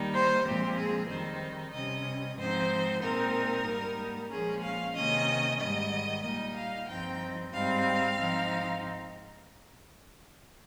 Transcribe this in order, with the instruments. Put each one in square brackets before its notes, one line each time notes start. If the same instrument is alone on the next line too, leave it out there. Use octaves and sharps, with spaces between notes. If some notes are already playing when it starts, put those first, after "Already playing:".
Already playing: [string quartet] D#3 G3 A#3 D#4
C5
A#2 F3 G#3 C4 G4
G#4
F2 D#3 G3 C4 D#4 C5
C3 G3 C#4 D#5
G#2 F3 C4 D#4 C5
A#2 G#3 C4 D#4 A#4
G#2 G3 A#3 D#4
A#2 F3 G#3 C#4 G#4
F5
C3 D#3 A#3 C#4 D#5
G#2 D#3 G3 D#5
A#2 G3 A#3 D#4 D#5
F5
G2 F3 C4 D#4 G5
G#2 G3 C4 D#4 F5
G#2 F3 C4 D#4